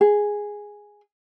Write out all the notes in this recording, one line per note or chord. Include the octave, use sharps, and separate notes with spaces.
G#4